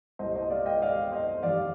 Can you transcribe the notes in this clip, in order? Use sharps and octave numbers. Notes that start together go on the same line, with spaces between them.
C2 A#2 G3 C5 D#5
C5 D#5
D5 F5
D#5 G5
D5 F5
C5 D#5
F2 D#3 G3 D5 F5